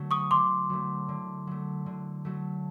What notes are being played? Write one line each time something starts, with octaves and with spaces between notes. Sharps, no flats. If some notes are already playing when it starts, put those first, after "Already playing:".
Already playing: D3 F#3 A3
C#6 D#6
D3 C6 D6
F#3 A3
D3
F#3 A3
D3
F#3 A3